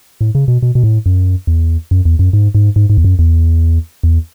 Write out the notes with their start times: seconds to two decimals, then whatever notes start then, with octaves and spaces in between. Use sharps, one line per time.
0.21 A2
0.35 C#3
0.48 B2
0.62 B2
0.75 B2
0.84 A2
1.06 F#2
1.47 E2
1.91 F#2
2.05 E2
2.19 F#2
2.33 G#2
2.55 G#2
2.76 G#2
2.90 G#2
2.98 E2
3.05 F#2
3.19 E2
4.03 E2